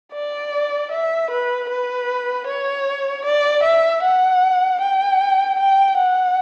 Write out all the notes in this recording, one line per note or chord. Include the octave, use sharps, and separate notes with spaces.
D5
E5
B4
B4
C#5
D5
E5
F#5
G5
G5
F#5